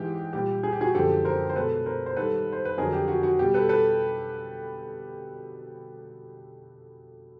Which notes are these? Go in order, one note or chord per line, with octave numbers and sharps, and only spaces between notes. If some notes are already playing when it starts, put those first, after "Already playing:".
Already playing: G#2 E3 G#3 G4
A#2 G3 G4
G#4
G4
F#4 G#4
F#2 D3 F3 G#3 G4 A4
A#4 C5
C5
B2 G#3 A4 B4
A#4 C5
C5
G#2 D#3 G3 A4 B4
C5
B4
F2 D3 F#3 G#4 A#4
G4
F#4
F#4
B2 G3 G4
A4 B4
A4 B4